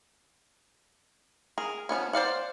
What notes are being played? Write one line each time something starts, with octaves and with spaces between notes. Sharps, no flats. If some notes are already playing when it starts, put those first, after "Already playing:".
G#4 A#4
F3 G#3 B3 C#4
C5 D5 F5 F#5